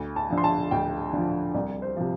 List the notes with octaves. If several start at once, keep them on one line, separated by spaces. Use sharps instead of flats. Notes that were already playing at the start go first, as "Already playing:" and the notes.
Already playing: D2
A5
D3 F3
C6
A5
D2 G5
D3 F3
C2 D5
C5
C3 F3